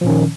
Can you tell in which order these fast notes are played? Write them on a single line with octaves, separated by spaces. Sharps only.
F3 A#2 C#4 D#3